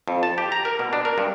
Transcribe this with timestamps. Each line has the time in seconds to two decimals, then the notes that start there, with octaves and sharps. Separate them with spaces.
0.08 F2
0.23 A5
0.38 G4
0.52 A#5
0.65 A#4
0.79 B2
0.93 D4
1.05 A#4
1.18 G2